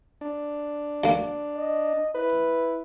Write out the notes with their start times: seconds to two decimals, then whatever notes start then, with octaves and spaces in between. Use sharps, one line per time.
0.21 D4
1.04 D2 A#3
1.57 D#5
2.15 E4 B4